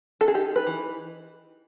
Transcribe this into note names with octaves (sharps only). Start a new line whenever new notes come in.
A4
G#4
D#4 G4
B4
E3